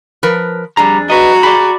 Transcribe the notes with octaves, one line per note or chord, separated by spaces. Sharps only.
F3 A#4 B4
F2 G3 D4 G#4 A#5
F#4 B4 D#5 A#5
G#4 D5 B5